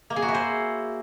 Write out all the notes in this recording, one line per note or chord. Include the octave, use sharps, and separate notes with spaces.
A#3
G#4
F#4
E4
C5